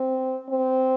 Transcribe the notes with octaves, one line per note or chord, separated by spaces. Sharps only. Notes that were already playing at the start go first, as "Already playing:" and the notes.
Already playing: C4
C4